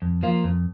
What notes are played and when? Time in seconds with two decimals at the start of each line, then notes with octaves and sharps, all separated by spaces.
0.02 F2
0.23 F3 A#3 F4
0.44 F2